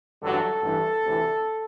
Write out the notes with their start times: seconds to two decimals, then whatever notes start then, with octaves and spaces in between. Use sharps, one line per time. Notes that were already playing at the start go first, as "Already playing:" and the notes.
0.21 A1 G2 D3 F#3 A4
0.61 A1 G2 E3
1.03 D2 C3 E3